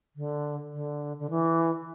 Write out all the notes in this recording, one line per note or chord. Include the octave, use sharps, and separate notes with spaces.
D3
D3
D3
E3